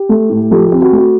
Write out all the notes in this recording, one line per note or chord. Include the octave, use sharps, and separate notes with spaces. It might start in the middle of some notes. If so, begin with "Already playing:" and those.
Already playing: G4
A3
A2
F3 G4 A4
G4
C4
F#4
A3
F#4